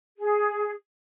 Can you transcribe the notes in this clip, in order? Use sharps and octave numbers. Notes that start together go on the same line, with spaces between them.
G#4